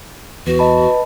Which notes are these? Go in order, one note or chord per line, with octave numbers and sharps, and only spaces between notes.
E2 F#4 B4
D#5 A5 B5